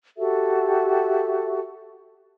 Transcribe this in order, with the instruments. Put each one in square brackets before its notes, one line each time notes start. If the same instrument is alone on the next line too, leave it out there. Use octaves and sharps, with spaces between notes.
[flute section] F#4 G4 A4 E5